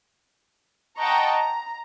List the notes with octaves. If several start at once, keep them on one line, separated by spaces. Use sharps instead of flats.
D#5 F#5 G5 A5 A#5 C#6
A#5